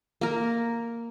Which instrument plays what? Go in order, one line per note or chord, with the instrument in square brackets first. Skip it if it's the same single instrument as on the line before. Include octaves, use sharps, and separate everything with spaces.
[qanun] A#3 A#4